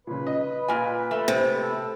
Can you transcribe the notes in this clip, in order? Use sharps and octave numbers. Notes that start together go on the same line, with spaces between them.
A#2 C#3 B4
D#5
A#2 F4 G#5
A3
C3
A4